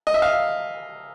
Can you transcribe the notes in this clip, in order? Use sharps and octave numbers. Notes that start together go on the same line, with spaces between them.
D#5
E5
F5